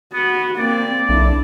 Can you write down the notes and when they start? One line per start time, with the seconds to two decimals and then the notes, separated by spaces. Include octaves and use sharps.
0.14 B3 F#4
0.57 A#3 C4 D5
1.09 B1 D4 E4